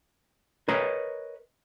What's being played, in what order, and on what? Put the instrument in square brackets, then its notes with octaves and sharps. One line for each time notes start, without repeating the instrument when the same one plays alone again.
[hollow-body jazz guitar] A#4 B4 C#5 D#5 A#5